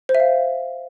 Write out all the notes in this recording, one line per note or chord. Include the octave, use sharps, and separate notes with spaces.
C5
E5
F5